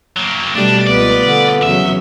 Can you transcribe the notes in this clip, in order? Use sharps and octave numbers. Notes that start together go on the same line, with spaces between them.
F#3 A#3
B2 G3 A3 D4
C#2 B3 F4 B4 D5
D3
E2 C#3 F#3 E5